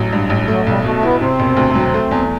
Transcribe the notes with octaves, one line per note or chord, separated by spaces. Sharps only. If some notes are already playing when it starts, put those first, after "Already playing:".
Already playing: A1 F#3
G2
A1
F#3 A3
B1 G3
B2 A3
A3
B3 E4
C3 C4
E1
D2
F#3
A3
E2